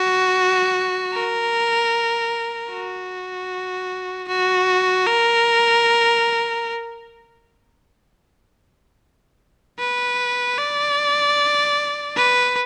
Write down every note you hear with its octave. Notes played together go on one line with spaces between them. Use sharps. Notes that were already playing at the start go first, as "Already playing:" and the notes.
Already playing: F#4
A#4
F#4
F#4
A#4
B4
D5
B4